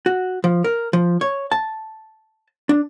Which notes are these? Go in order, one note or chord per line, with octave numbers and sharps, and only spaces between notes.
F#4
F3
A#4
F3
C#5
A5
D4